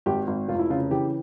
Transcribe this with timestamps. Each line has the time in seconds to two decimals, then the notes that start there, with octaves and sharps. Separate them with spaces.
0.06 G#1 G4
0.27 G#1
0.49 F1 F4
0.59 E4
0.70 C#3 F4
0.91 E3 G4